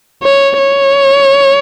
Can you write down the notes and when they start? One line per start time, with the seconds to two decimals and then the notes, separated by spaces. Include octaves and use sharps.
0.23 C#5
0.58 C#5